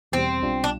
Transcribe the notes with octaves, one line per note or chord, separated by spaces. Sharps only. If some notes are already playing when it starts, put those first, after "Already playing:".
E2 B2 G3 C4
B1 B2 G3 D4 F4
D4